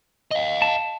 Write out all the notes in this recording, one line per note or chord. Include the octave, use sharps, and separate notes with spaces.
D#5 F5
A5